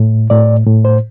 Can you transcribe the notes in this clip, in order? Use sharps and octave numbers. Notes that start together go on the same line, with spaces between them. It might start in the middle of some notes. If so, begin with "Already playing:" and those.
Already playing: A2
A2 D5
A2
C5